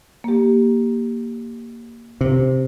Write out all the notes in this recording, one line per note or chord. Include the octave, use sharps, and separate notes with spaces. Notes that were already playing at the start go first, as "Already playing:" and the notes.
A#3 G4
C3